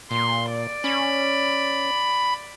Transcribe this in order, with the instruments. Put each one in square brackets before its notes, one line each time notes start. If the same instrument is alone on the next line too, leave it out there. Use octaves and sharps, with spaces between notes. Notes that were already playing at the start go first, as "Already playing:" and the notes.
[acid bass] A#2 [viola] C6
[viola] D5
[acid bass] C#4 [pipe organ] B5